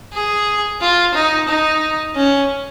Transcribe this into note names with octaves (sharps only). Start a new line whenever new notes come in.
G#4
F4
D#4
D#4
C#4